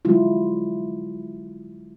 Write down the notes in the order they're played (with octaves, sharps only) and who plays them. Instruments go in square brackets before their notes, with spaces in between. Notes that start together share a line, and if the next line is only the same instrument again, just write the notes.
[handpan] D3 F#3 G#3 E4 F4